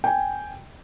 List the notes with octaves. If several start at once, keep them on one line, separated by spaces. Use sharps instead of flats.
G5 G#5